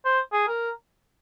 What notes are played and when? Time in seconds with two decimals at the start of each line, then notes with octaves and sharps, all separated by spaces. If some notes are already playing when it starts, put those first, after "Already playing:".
0.05 C5
0.33 G#4
0.48 A#4